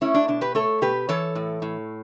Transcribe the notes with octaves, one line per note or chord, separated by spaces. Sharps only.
A3 C#4 E4
D4
B2 D4
G4 B4
A3 A4 C#5
B2 G4 B4
E3 A4 C#5
A2
A2